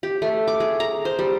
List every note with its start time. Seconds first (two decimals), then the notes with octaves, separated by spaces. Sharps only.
0.03 G4
0.22 A3
0.48 D6
0.60 G#4
0.80 A#5
1.05 C5
1.19 G3